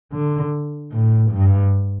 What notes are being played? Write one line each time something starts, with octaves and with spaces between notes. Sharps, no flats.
D3
A2
G2